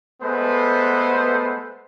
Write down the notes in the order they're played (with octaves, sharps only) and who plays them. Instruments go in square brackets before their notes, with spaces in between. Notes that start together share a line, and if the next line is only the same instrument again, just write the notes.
[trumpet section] G#3 A3 B3 A4 B4 C5